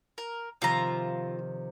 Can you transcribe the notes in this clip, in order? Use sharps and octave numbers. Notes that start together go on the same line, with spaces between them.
A#4
C3 D#3 F3 F4 E5 A#5